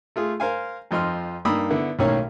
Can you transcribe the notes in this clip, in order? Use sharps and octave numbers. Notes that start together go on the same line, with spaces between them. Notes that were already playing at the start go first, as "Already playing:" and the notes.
A3 F4 G#4
A#4 C5 F5 G#5
F2 F3 D#5 C6 F6
G2 A#3 D#4 B5 D#6 E6
D3 B3 E4
B1 A2 D#3 A#3 C#4 C#5